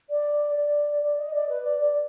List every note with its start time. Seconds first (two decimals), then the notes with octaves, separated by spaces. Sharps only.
0.10 D5
0.57 D5
1.03 D5
1.18 D#5
1.34 D5
1.49 B4
1.64 D5
1.80 D5